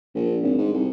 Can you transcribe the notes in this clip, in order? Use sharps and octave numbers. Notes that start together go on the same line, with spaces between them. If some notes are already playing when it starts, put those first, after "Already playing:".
A#1
G#1
G#2
C2